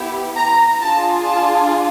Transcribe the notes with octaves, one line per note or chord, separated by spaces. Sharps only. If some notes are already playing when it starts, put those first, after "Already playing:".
Already playing: B3 E4 G4
A#5
D4 F4 G#4 A5
A5